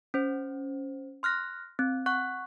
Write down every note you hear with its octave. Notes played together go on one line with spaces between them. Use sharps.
C#4 C5
C6 F6 F#6 A#6
C4
F#5 C#6 F#6